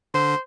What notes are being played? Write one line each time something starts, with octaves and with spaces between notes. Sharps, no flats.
D3 C5